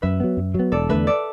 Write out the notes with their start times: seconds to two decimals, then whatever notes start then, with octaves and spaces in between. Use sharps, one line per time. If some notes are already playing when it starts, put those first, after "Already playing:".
0.02 F#2 B4 E5
0.20 F#3 B3
0.37 F#2
0.54 F#3 B3
0.72 E1 A4 D5
0.89 E2 D3 A3 B4 E5
1.07 A4 D5